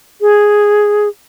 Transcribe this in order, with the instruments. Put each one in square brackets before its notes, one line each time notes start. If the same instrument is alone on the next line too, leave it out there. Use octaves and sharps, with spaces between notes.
[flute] G#4